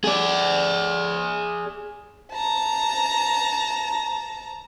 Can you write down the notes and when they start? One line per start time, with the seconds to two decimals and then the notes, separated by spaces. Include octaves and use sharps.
0.04 G#4 D5
2.32 A5 A#5